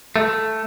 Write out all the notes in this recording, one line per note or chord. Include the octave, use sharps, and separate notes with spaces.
A3